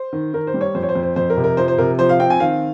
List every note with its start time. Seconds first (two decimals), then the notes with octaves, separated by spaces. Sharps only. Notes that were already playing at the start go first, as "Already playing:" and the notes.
Already playing: C5
0.13 D#3
0.33 D#3 A#4
0.47 C5
0.54 G3
0.61 C#5
0.75 F2 C5
0.83 C#5
0.89 C5
0.95 F2
1.03 C5
1.16 F2 C5
1.30 A#4
1.37 C3
1.44 A#4
1.57 F3 C5
1.68 C5
1.78 C3 A#4
1.99 F3 C5
2.09 F5
2.20 C4 G5
2.30 G#5
2.40 D#3 F5